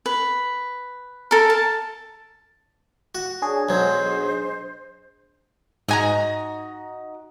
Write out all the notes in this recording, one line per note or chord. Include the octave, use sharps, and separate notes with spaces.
B4
A4 A#4
A5
F#4
D4 G#4 C#5
B1 F#3 C5 D#5
G#2 D#4 F#4 D#5 G#5 A#5